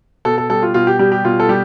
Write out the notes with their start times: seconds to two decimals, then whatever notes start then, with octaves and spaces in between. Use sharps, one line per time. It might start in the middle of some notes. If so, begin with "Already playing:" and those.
0.25 B2 A4
0.38 A4
0.50 G3 A4
0.62 F4
0.74 B2 F4
0.87 G4
0.99 G3 G4
1.12 G4
1.24 B2 F4
1.40 A4
1.49 G3 G4